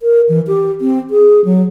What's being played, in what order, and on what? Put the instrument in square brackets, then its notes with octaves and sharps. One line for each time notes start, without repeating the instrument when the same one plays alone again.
[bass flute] A#4
E3
G4
C4
G#4
F#3